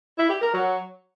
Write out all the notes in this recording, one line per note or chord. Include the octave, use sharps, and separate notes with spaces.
E4
G4
A#4
F#3